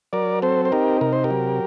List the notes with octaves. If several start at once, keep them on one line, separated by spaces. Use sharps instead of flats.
F#3 A#4 D5
C4 A4 C5
C5
D#4 G4 A#4
C3 A#4
C5
G4 A#4
F#3